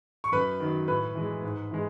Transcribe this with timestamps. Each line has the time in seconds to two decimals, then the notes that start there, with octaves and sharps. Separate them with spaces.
0.24 C#6
0.32 F#2 B4 B5
0.60 D#3 F#3
0.88 A2 B4 B5
1.15 E3 G#3
1.42 G#2
1.71 E3 G#3